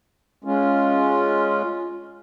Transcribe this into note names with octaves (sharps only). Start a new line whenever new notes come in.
G#3 C#4 F4